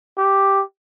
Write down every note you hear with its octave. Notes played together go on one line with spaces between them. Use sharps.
G4